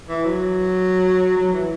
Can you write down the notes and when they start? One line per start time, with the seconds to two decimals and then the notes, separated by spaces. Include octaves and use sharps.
0.08 E3
0.25 F#3
1.37 F#3
1.53 E3